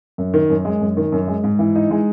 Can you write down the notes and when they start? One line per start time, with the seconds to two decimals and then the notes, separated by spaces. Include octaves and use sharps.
0.18 F#2
0.34 D#3
0.50 F#2
0.65 G#3
0.81 F#2
0.97 D#3
1.12 F#2
1.28 G#3
1.44 G#2
1.59 E3
1.75 D#4
1.91 G#3